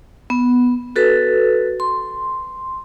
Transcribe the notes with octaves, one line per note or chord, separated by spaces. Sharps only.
B3
F#4 A4 B4
C6